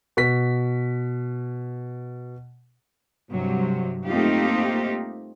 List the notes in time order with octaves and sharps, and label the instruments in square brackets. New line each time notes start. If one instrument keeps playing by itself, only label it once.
[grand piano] B2 B6
[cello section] G2 C3 F#3
A3 A#3 C4 D#4 F4 G4